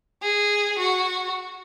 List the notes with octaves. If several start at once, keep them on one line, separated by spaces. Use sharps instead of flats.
G#4
F#4